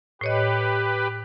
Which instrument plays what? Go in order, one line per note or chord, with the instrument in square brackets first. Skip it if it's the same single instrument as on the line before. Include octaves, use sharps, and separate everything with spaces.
[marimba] A2 C#5 D#5 [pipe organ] G4 B4